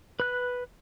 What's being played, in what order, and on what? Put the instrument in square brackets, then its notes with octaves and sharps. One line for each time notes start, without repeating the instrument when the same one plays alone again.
[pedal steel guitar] B4 F#6